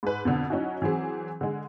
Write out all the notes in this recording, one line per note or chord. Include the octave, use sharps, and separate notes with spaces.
G#2 B4
F2 B2 D3
F#3 C#4 D#4 E4 F#4
E3 F#3 C4 G#4
D3 G#3